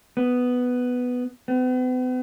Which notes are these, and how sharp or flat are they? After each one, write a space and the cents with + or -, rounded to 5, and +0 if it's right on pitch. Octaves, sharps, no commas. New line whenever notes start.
B3 +5
B3 +45